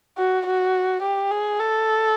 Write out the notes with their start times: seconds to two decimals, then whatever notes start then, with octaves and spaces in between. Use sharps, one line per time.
0.18 F#4
0.46 F#4
1.03 G4
1.31 G#4
1.60 A4